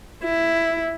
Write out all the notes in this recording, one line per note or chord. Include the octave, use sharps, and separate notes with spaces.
E4